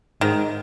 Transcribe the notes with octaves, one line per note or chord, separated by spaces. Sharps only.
G#2 D#3